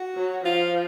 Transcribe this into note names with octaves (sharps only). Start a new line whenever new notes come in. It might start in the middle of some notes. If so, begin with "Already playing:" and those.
Already playing: F#4
F#3
F3 F4